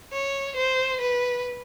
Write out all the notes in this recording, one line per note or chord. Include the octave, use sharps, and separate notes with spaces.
C#5
C5
B4